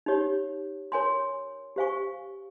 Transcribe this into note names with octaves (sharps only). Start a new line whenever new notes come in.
D#4 G4 C#5
A#4 C#5 G#5 C6
G4 C5 F5 G#5 C#6